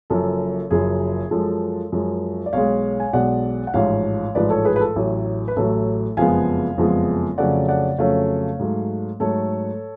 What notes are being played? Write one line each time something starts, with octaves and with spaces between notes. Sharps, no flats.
F#1 F#2 F3 A4
F#1 F#2 F3 G#4
F#2 F3 G#3 A4
F#2 F3 G#3
D5
B1 B2 G#3 C#5 F5
G#5
B1 B2 G#3 D5 F#5
F#5
A1 G#2 F3 C#5 F5
A1 G#2 F3 B4 D5
A4 C#5
G#4 B4
B4
A4
A1 A2 F#3
B4
A1 A2 F#3 A4
F#1 F2 F3 G#3 B3 F5 G#5
F#1 F2 F3 G#3 B3
F2 C#3 F#3 A3 C#4 D5 F#5
D5 F#5
F2 C#3 F#3 A3 C#4 C#5 F5
G#2 F#3 A3
G#2 F#3 A3 A4 C#5